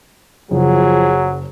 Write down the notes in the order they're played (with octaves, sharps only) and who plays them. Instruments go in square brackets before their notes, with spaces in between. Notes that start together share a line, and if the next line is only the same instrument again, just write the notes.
[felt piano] F#1 [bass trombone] F3 [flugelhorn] F#3 [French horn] G#4